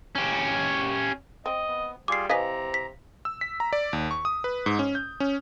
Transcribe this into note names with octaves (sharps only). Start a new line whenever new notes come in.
C#4 G4
C4 D#5
B3
G3 F4 G#4 D6 C7
C3 E3 B4 D#5 F5 A#5 B6
B6
E6
B6
A#5
D5
D#2
C#6
D#6
B4
G#2
C#4
G6
C#4